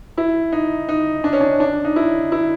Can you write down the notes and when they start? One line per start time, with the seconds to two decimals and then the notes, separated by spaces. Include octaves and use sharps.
0.18 E4
0.52 D#4
0.89 D#4
1.24 D4
1.33 C#4
1.41 D4
1.60 D4
1.85 D#4
1.96 E4
2.32 E4